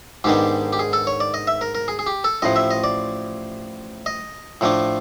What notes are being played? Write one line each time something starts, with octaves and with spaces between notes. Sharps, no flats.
G#2 D#3 G#3 B3 D4 G4
G4
G#4
A4
C#5
D5
D#5
E5
A#4
A#4
G#4
G#4
G4
A4
A1 A2 F3 D#5
E5
D#5
D5
D#5
A2 F3 A3 D4